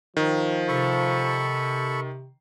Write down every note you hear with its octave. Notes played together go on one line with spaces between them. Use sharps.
D#3 F3
C3 A4 B5 C#6